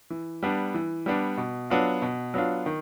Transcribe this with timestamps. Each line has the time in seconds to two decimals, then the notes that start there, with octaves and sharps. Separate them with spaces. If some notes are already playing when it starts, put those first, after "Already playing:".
0.10 E3
0.43 G3 B3 D4
0.74 E3
1.06 G3 B3 D4
1.38 B2
1.70 F#3 B3 D4 F4
2.02 B2
2.34 F#3 B3 D4 F4
2.66 D#3